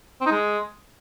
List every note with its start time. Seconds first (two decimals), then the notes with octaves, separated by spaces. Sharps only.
0.21 C4
0.26 D#4
0.32 G#3